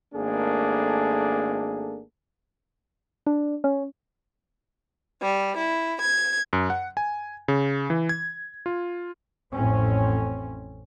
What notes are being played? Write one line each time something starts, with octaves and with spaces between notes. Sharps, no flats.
G#1 A3 A#3 D4 G#4 A4
D4
C#4
G3
E4
G#6
F#2
F#5
G#5
C#3
E3
G#6
F4
A1 F2 A2 C4 C#4